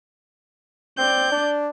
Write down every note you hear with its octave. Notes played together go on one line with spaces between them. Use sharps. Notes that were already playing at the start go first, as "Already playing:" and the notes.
C4 D5 G6
D4